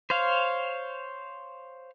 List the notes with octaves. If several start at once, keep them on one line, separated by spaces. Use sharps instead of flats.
C5 C#5 F5